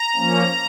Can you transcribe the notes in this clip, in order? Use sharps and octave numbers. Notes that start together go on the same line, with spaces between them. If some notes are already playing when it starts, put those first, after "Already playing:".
Already playing: A#5
F3 A#3 C#4